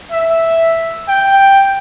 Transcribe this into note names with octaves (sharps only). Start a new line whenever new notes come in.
E5
G5